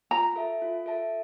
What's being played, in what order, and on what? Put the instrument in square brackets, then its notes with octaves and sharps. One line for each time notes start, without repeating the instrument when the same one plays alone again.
[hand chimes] F4 [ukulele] A#5
[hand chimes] A4 E5 A5
F4
A4 E5 A5